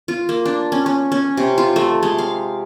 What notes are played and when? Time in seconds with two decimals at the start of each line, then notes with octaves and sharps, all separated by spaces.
0.08 F4
0.29 A#3
0.46 D4
0.72 C#4
0.86 C#4
1.12 C#4
1.37 C3
1.58 F4
1.76 A3
2.03 G#3
2.18 F5